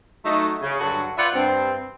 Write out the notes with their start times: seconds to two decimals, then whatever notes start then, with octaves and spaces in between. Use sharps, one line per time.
0.24 F#3 A3 D#4
0.62 C#3
0.80 G2 D3 F#3 F#4
1.17 F4 B4 C5 D5 E5 F#5
1.34 G2 C4